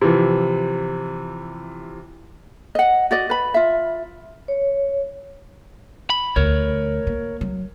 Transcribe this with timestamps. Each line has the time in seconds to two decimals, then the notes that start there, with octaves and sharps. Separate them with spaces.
0.01 C3 E3 F3
2.75 D#5 F#5
3.11 F#4 D5 D#5
3.30 B4 B5
3.54 F4 E5
4.48 C#5
6.10 B5
6.36 D2 A#4 C#5
7.07 A#3
7.41 F#3